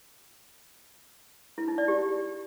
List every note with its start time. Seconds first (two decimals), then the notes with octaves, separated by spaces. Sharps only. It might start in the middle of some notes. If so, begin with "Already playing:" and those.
1.58 E4
1.68 D#4
1.78 D5
1.88 G4